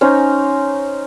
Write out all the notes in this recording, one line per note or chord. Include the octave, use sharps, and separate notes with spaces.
C#4 D#4 C5 A#5